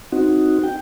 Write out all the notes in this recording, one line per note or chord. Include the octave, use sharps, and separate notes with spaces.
C4 D#4 F#4
G5